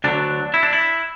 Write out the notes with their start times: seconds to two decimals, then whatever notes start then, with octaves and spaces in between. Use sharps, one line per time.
0.04 D2 D3 F#3 D4
0.54 E4
0.63 D4
0.73 E4